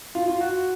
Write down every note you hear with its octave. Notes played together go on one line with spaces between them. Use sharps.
F4
F4
F#4